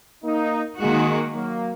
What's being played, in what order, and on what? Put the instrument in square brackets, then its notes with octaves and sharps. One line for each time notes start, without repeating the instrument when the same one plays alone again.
[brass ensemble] A#3 D#4
[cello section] D#3 A#3 F#4 [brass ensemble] G#3
[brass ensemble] F#3 A#3